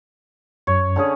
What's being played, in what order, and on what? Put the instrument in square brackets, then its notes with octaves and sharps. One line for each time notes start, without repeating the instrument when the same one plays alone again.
[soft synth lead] F#2 [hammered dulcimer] C#5
[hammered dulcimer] D3 C#4 G#4